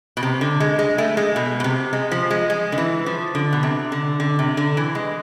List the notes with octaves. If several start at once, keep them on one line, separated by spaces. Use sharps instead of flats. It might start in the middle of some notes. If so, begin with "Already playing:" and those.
B2
C3
D3
G#3
G#3
A3
G#3
B2
B2
C3
G#3
F3
G#3
G#3
D3
E3
F3
D3
B2
C3
D3
D3
C3
D3
E3
G#3